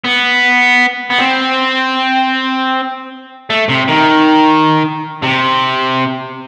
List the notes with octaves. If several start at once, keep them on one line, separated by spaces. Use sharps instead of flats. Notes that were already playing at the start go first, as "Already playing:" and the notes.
B3
B3
C4
A3
C3
D#3
C3